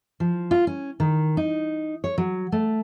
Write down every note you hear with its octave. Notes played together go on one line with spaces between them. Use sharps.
F3
F4
C#4
D#3
D#4
C#5
F#3
A3